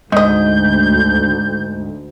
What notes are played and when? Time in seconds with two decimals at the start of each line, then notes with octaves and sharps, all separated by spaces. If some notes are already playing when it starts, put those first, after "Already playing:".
0.12 D2 G#2 D#4 D#5 G6